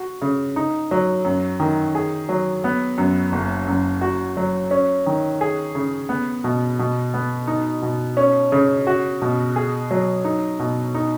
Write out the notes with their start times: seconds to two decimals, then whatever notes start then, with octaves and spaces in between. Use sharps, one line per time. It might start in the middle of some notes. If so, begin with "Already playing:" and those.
Already playing: F#4
0.22 C#3
0.56 D#4
0.91 F#3
1.25 F#2
1.60 D#3
1.95 G#4
2.29 F#3
2.64 B3
2.98 F#2
3.32 F#1
3.68 F#2
4.01 F#4
4.37 F#3
4.71 C#4
5.06 D#3
5.41 G#4
5.75 C#3
6.09 B3
6.44 B2
6.79 B2
7.14 B3
7.47 D#4
7.82 B2
8.17 C#4
8.52 C#3
8.87 F#4
9.22 B2
9.56 G#4
9.91 F#3
10.25 D#4
10.59 B2
10.94 D#4